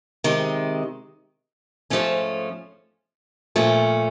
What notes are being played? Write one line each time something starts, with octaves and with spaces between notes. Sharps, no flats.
C3 D#3 G#3
G#2 F3 A3 C#4
A#2 F3 A3 C#4